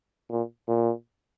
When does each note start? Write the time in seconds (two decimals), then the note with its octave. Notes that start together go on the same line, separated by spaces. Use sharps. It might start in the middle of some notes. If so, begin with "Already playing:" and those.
0.30 A#2
0.68 A#2